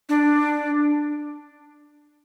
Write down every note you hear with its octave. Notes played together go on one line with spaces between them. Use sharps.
D4